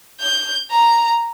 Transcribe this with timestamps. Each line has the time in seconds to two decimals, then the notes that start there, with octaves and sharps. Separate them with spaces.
0.20 G6
0.71 A#5